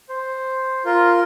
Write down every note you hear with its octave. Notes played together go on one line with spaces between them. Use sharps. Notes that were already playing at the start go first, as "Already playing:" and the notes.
C5
F4 A#4